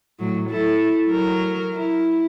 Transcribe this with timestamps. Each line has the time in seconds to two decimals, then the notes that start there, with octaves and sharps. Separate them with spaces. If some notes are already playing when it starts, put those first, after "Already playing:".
0.19 A2 F#3
0.50 E4 A4
1.08 F#3 A#4
1.74 E4